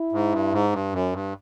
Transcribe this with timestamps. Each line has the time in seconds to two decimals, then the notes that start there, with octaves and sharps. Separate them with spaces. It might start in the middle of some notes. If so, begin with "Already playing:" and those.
Already playing: E4
0.12 G#2
0.32 G2
0.53 G#2
0.72 G2
0.93 F#2
1.12 G2